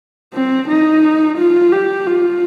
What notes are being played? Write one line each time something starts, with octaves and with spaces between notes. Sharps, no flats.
C4
D#4
F4
G4
F4